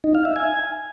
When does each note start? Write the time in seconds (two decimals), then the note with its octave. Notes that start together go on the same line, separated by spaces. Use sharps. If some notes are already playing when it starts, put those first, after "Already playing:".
0.04 D#4
0.15 F5
0.25 E5
0.36 G#5